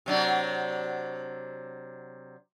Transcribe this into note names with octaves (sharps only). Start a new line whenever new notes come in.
C3 F#3 D4